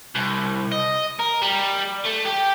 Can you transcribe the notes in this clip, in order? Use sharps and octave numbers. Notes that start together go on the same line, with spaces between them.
C2
D#5
A#4
G3
A3
G4